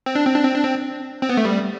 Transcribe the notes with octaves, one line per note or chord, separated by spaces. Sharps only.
C4
D4
C4
D4
C4
D4
C4
C4
B3
A3
G3